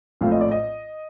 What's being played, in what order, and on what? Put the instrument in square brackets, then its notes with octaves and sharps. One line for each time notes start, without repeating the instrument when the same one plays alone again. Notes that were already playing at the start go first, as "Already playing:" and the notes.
[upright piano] A#1 A2 A3 C4 F4 F5
D#5
D5
D#5